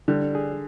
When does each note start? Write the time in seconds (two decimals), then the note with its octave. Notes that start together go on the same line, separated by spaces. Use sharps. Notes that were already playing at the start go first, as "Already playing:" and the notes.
0.08 D3 G3
0.35 G#4